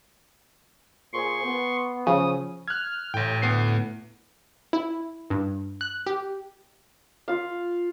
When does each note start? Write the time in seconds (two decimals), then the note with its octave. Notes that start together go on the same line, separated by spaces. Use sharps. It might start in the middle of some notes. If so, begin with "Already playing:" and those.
1.13 A#2 G#4 C5 C6 C#6
1.44 B3
2.07 C#3 F3 D#6
2.68 F6 F#6 G#6
3.14 A1 A2 G5
3.42 D2 B3 C7
4.73 E4
5.30 G2
5.81 F#6
6.07 G4
7.28 F4 F5